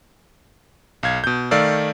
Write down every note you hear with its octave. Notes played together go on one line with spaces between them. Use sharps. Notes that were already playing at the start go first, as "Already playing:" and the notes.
B1 F5 G#6
B2 G6
D#3 A3 D5 F5 E6